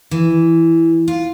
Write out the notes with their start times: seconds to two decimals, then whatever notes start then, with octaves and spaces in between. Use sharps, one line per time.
0.11 E3
1.08 F4